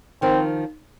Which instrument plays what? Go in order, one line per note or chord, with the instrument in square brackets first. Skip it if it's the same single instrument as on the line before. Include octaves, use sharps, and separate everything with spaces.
[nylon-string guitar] D#3 F3 [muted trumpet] C4